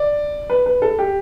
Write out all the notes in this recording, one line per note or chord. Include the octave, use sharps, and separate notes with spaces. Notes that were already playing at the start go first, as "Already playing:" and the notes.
Already playing: D5
B4
B4
A4
G4